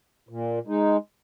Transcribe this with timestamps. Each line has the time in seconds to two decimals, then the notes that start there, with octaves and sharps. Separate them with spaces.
0.29 A#2
0.67 G#3 D#4